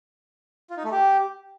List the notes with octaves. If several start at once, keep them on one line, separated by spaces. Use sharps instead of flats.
F4
D#4
A3
G4